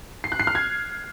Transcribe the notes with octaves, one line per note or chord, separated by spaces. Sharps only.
C7
F#6
C7
F6
G#6